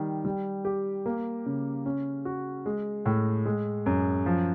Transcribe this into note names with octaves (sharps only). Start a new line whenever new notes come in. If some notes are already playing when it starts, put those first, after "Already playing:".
Already playing: D#3 G3
G3
G4
A#3
C#3
C#4
F#4
G#3
A2
G#3
F#2
F3